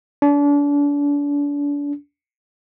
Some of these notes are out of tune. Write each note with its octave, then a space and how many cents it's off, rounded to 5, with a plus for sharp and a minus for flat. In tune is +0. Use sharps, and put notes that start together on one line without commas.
D4 -35